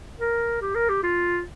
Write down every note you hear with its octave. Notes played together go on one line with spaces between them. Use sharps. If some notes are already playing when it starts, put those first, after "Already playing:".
A#4
G4
A#4
G4
F4